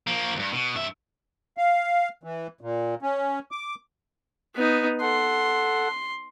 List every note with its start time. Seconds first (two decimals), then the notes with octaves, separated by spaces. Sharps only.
0.07 F3 A#3
0.35 D2 G2
0.53 B2
0.75 G2 E5
1.57 F5
2.23 E3
2.61 A#2
3.02 C#4
3.51 D6
4.55 B3 D#4
5.00 A4 F#5 C6